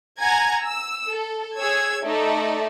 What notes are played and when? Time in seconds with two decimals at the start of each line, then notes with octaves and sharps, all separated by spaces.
0.19 F#5 G#5 A#5 G#6
0.64 E6
1.10 A4
1.56 G#4 C#5 E6 G#6
2.04 A3 D#4 A4 D5 E5